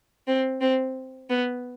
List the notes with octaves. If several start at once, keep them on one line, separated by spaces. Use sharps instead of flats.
C4
C4
B3